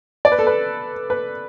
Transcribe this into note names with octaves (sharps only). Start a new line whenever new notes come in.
D5
B4
A4
B4
B4